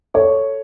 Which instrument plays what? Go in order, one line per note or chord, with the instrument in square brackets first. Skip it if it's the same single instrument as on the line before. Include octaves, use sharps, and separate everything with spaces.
[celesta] A4 [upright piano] C#5